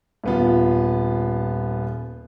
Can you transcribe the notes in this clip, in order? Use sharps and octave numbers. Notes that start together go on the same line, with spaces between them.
D#1 B3 F4